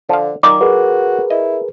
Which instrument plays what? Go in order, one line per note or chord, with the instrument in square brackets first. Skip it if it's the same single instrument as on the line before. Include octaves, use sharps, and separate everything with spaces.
[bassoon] D3 [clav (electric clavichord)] F3 F5
[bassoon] D#3 [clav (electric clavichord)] D#4 F4 D5 [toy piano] D6
[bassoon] F#4 [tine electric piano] G#4 A#4 B4
[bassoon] E4 [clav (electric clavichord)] D#5